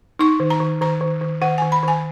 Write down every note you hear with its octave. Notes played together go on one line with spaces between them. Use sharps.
D#4 C#6
D#3
A#5
D#3
D#3 A#5
D#3
D#3
D#3 F#5
D#3 G#5
B5
D#3 G#5